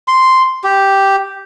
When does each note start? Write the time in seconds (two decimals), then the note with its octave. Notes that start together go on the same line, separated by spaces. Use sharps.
0.08 C6
0.64 G4